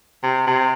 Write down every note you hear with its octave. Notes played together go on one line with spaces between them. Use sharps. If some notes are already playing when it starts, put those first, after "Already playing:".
C3
C3